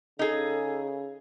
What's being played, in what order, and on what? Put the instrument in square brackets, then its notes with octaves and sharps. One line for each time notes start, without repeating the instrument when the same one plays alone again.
[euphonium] C#3 [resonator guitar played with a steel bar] D#4 G#4 [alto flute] A4